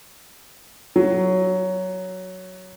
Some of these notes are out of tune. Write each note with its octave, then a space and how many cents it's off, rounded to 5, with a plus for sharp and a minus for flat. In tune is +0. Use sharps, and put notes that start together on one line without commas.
F#3 +5